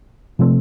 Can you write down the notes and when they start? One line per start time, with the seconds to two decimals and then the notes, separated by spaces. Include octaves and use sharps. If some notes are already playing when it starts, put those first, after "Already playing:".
0.39 C3 F3 A3 C4